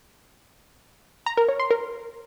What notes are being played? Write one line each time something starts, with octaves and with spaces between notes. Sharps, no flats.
A#5
A#4
C#5
C6
A#4